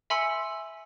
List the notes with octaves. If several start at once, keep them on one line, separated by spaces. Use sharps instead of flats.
E5 G#5 B5 C6 E6 C#7